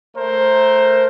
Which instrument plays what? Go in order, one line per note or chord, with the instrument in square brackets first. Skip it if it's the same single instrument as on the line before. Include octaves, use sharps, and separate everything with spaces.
[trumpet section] A3 A#4 C5